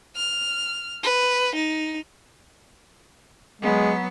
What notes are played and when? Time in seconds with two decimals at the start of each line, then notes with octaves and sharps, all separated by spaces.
0.16 F6
1.03 B4
1.55 D#4
3.62 F#3 G#3 B3